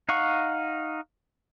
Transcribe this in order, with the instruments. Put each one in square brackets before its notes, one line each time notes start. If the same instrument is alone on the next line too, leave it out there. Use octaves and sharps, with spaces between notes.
[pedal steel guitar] D#4 F5 F#5 C#6